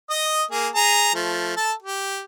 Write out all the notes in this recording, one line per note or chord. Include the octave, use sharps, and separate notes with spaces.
D#5 D#6
A#3 G#4
G#4 A#5
F3 A3
A4 A5
G4